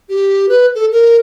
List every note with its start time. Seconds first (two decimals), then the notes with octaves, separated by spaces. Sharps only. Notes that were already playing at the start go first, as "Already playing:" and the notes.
0.09 G4
0.49 B4
0.75 A4
0.92 A#4